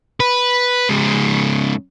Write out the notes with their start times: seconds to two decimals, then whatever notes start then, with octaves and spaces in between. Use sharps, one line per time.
0.20 B4
0.90 G#2 C#3